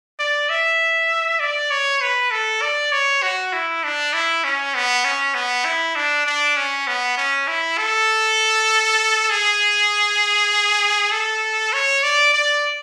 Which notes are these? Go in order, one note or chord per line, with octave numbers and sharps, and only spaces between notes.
D5
E5
D5
C#5
B4
A4
D5
C#5
F#4
E4
D4
E4
C#4
B3
C#4
B3
E4
D4
D4
C#4
B3
C#4
E4
A4
G#4
A4
C#5
D5
D5